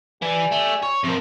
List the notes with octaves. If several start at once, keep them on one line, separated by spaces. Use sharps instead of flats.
E3 G4 D5 G#5
A3
C#5
C3 F3 A#3